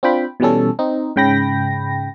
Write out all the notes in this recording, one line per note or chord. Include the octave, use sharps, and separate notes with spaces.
C4 D4 F4 G5 B5
B2 E3 G3 C#4 A4
C4 D#4
G#2 C#3 G5 B5 A#6